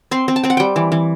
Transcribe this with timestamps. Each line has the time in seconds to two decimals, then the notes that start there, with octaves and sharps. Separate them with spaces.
0.11 C4 C6
0.28 C4
0.36 A5
0.43 C4 G5
0.50 F#5
0.57 G3 G5
0.76 E3
0.92 E3